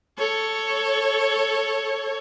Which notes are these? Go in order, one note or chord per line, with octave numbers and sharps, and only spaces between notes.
A4 C#5